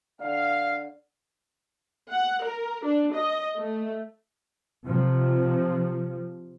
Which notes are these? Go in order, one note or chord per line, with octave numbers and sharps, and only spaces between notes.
D3 F5
F#5
A#4
D4
D#5
A3
C3 F3